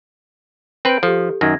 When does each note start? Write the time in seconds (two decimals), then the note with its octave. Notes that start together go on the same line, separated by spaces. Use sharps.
0.85 C4 B4 G6 D7
1.03 F3 G4 A4
1.41 F#2 D#3 G#6 A#6